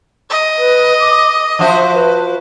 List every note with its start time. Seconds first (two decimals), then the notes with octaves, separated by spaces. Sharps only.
0.30 D#5
0.58 B4
1.00 D6
1.59 F3 F#4 C5 E5
1.94 B4